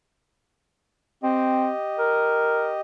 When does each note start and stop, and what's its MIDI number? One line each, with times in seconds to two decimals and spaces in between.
1.23 1.70 60
1.23 2.81 67
1.23 2.81 75
1.99 2.74 70